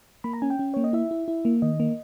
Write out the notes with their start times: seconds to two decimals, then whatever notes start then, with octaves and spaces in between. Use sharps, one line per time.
0.24 A#3 B5
0.33 A#5
0.42 C#4 G#5
0.50 G5
0.59 C#4
0.74 A#3 C#5
0.84 D#5
0.93 E4 E5
1.11 E4
1.28 E4
1.45 A#3
1.62 D#3 D#5
1.80 A#3